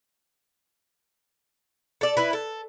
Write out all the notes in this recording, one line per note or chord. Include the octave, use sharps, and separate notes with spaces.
A4 D5
E4 B4
A4